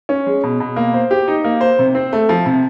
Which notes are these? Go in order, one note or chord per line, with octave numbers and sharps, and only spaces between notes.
C#4
G#3
B2
B2
A#3
C5
G4
D#4
A#3
C5
C3
C4
A3
F3
C3